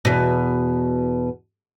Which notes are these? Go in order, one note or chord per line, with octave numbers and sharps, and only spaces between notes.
E2 B2